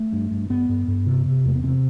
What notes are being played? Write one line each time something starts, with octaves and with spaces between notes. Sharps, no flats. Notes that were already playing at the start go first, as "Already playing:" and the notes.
Already playing: A3
G2
G2
G2 B3
G2
G2
C3
C3
E2 A3
B3
C3 C4